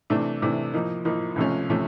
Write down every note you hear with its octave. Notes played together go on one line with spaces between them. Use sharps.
C3 E3 A3 D4
C3 E3 A3 D4
A2 F3 A#3 D#4
A2 F3 A#3 D#4
C#2 C3 F3 A3 C#4
C3 F3 A3 C#4